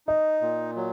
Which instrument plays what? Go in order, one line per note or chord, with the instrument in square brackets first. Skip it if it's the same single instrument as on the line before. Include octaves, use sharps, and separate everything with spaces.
[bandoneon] D#4 [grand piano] D#5
[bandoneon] A#2
F#3